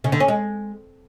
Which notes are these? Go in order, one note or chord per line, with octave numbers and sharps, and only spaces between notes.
C#3
D3
C#4
G#3